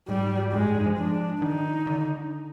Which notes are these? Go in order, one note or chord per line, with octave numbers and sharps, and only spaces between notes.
G#2 G3
G2 G#3
G#2
G2
F3
D4
D#3 D#4
D3